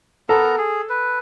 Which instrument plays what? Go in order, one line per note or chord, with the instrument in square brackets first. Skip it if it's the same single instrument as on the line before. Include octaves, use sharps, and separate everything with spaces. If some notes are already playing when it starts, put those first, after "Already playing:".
[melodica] B3 A#4 A#5 [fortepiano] A4
[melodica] G#4
B4